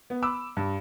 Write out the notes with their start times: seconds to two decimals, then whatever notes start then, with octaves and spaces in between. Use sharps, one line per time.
0.10 B3
0.22 B5 D6 E6
0.57 G2